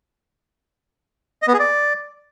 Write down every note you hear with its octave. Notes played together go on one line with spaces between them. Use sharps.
D#5
B3
G#4
D5